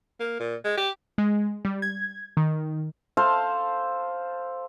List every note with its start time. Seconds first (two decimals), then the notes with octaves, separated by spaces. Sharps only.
0.20 A#3
0.40 A#2
0.64 G#3
0.77 G4
1.18 G#3
1.65 G3
1.82 G#6
2.37 D#3
3.17 A4 C5 F5 A5